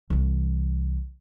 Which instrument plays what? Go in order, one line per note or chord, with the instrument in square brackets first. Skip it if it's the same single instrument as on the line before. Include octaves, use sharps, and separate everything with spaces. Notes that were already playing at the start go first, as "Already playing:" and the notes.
[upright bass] C2 E3